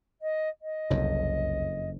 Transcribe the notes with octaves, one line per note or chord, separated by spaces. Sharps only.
D#5
D#5
F#1 C2 F2